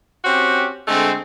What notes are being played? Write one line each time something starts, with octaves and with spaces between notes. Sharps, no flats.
C4 C#4 F#4 G4
D3 G#3 A3 C4